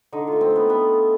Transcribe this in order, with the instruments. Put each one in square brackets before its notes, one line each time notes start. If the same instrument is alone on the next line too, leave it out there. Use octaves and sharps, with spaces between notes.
[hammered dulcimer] D3 D#4
A3 F4
C4
A3
B3
A3 B3